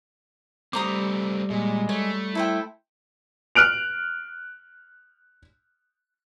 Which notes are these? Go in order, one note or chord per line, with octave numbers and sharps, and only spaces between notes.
G3 A3 C4 C5 A#5 D6 D#6
A#2 G#3
A3 C#5
E4 A4 C5 G5
F6 F#6 D7 F7